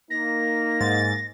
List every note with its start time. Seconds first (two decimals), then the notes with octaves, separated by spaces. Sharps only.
0.11 A#3 D#4 A#6
0.80 G#2 A6